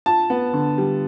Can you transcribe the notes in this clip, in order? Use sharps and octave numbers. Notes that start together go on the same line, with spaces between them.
F4 A5
B3
D3
G3